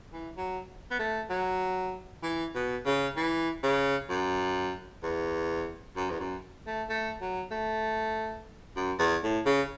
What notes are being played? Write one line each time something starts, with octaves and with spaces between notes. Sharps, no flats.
E3
F#3
B3
A3
F#3
E3
B2
C#3
E3
C#3
F#2
E2
F#2
E2
F#2
A3
A3
F#3
A3
F#2
E2
A2
C#3